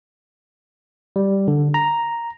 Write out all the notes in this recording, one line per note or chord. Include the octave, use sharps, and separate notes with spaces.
G3
D3
A#5